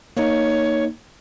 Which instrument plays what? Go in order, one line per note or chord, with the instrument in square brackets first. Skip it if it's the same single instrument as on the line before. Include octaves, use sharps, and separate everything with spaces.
[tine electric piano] A#3 D#4 [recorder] C#5